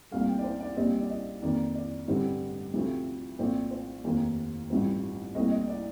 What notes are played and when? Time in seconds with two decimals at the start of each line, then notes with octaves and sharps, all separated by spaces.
0.11 C2 A#2 A3 F5
0.28 G5
0.39 D5
0.44 C5
0.61 D5
0.77 A#1 A#2 G3 C4 D#5
1.00 D5
1.10 D#5
1.42 F2 D#3 A#3 D5
1.75 D5
2.08 A1 G2 D3 G3 C4
2.74 D2 C3 F3 A3 C4
3.39 A#1 A2 F3 A3 C4 D5
3.71 C5
4.04 F1 D#2 D#3 A#3
4.70 A1 G2 F3 C4
5.35 C2 A#2 A3 C4 D#5
5.51 D#5
5.68 D5